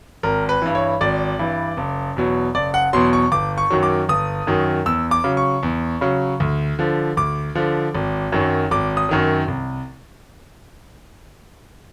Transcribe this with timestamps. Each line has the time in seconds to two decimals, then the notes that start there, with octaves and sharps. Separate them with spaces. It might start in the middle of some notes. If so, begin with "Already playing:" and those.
0.23 G#1 A#4
0.49 B4
0.62 G2 E3
0.75 C#5
1.01 G#1 D5
1.39 G2 E3
1.77 F#1
2.17 E2 B2 F#3
2.55 F#1 D5
2.74 F#5
2.93 E2 B2 F#3 C6
3.13 C#6
3.32 G1 D6
3.58 C#6
3.70 F#2 D#3 F#3
3.83 D6
4.09 G1 D#6
4.47 F#2 D#3 F#3
4.86 E2 E6
5.11 D6
5.24 C#3 F#3
5.37 C#6
5.63 E2
6.01 C#3 F#3
6.40 D2
6.79 D3 F3
7.17 D2 D6
7.55 D3 F3
7.95 G#1
8.32 F#2 D#3 F#3
8.71 G#1 D6
8.97 D#6
9.09 F#2 D#3 F#3
9.48 C2